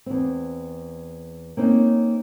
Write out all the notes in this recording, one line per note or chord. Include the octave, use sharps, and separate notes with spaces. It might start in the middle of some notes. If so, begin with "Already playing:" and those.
E2 C4
A#3 C4 C#4 D#4